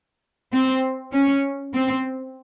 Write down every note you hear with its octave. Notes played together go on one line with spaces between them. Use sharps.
C4
C#4
C4